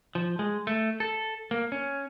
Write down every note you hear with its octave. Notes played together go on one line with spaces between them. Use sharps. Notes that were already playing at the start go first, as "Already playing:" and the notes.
F3
G#3
A3
A4
A#3
C#4